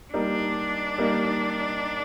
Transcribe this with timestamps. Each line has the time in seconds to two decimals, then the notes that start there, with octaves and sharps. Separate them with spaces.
0.13 G3 A#3 D4 D#4
0.98 G3 A#3 D#4